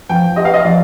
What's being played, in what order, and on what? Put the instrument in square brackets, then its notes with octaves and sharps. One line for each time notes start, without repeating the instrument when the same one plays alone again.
[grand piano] F3 [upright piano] G5
[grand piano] G4 [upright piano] D#5
[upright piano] F5
D#5
[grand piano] F3 [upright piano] D5